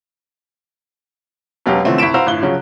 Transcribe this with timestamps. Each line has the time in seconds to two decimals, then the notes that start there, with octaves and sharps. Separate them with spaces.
1.66 E1 B2 F#3 C#4 G4 F5
1.84 D3 E3 F3 A3 C4 C#4
1.98 C2 C#6 B6 D7 E7
2.14 F#4 B4 C5 F5 A#5 E6
2.26 G1 A2 F#6 G7
2.43 C#3 F3 F#3 C#4